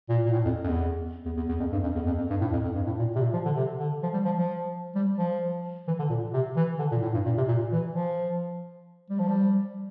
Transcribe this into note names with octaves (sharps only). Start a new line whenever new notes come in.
A#2
A#2
A2
F2
F2
E2
E2
E2
E2
F2
G2
F2
E2
F2
F2
G2
A2
F2
F2
G2
A2
A#2
C3
A#2
F3
D3
C3
D3
F3
G3
F3
F3
G3
F3
E3
D3
A#2
C3
E3
D3
A#2
A2
G2
A#2
C3
A#2
E3
F3
G3
F3
G3